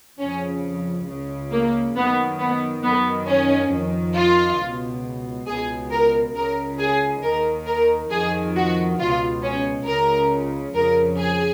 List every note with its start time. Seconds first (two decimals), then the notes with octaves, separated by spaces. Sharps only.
0.19 F2 C#3 C#4
1.07 C#2 C#3
1.51 A#3
1.95 F#2 D#3 B3
2.39 B3
2.83 F#2 D#3 B3
3.27 C#4
3.71 F2 D#3
4.15 F4
4.58 C#2
4.64 B2
5.46 C#2 B2 G#4
5.91 A#4
6.35 C#2 C#3 A#4
6.78 G#4
7.23 D#2 D#3 A#4
7.66 A#4
8.11 F2 D#3 G#4
8.56 F#4
8.99 C#2 B2 F4
9.43 C#4
9.86 C#2 C#3 A#4
10.74 F2 C#3 A#4
11.19 G#4